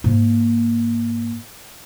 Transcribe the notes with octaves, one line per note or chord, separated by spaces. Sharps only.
G#2 A#3